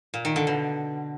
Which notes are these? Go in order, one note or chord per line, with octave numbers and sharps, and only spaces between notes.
A#2
D#3
D3
B2